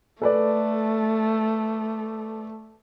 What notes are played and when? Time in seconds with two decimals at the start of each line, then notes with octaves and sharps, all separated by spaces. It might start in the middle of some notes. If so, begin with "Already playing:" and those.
0.22 A3 A4 B4 D5